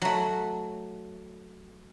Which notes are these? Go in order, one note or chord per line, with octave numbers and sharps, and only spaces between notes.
F#3 A3